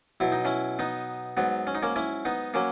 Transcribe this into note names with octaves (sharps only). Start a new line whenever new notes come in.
B2 F#3 E4
D#4
C#4 E4
B3 D#4
G#2 F#3 B3
C#4
D#4
A#3 C#4
C#4 E4
B3 D#4
F#3 A#3 C#4